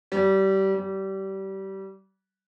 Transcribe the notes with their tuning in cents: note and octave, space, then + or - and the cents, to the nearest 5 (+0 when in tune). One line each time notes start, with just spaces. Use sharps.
G3 -25
G3 -25